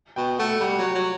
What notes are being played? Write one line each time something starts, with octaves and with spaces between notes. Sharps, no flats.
B2 G5
A3 F#5
G3 F#5
F#3
F#3